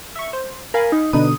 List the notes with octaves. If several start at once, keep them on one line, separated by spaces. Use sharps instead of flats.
E5 C#6
C5
A#4 F5 G#5 B5
D#4
B2 D3 D4 D#4 B4 D#6